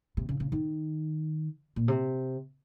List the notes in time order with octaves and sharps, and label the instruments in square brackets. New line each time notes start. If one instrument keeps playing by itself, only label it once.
[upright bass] C3
C#3
C#3
D#3
A#2
C3